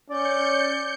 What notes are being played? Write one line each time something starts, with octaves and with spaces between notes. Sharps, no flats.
C#4 D5 G6 C#7